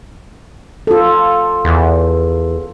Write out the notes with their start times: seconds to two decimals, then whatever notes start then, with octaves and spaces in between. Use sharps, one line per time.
0.87 F4 A4
1.65 E2